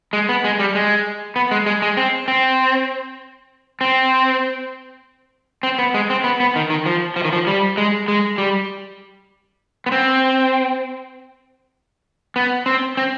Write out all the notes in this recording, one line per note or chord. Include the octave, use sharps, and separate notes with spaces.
G#3
B3
G#3
G3
G#3
B3
G#3
G#3
G#3
C4
C4
C4
C4
B3
G#3
C4
B3
B3
D#3
D#3
F3
F3
D#3
F3
G3
G#3
G#3
G3
B3
C4
B3
C4
C4